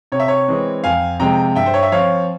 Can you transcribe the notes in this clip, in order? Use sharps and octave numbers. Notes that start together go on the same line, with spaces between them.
C3 C#5
E5
C#5
E3 G#3 C4
F2 F5 G#5
C3 F3 G#3 G5 A#5
G2 E5 G5
C5
C#5
E5
F3 C4 C#5 F5